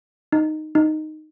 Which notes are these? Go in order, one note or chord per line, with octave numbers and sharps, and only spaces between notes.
D#4
D#4